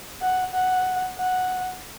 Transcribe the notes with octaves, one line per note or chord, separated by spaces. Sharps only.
F#5
F#5
F#5